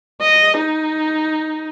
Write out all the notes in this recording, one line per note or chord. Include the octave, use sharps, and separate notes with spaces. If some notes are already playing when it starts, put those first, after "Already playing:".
D#5
D#4